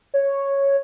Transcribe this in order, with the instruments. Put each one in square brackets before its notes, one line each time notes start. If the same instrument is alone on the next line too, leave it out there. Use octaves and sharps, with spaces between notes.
[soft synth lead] C#5